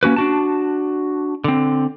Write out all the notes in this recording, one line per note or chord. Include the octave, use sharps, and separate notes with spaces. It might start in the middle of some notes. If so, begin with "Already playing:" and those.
A#3 C#4 F#4 B4
D4 F#4 A5
D3 C4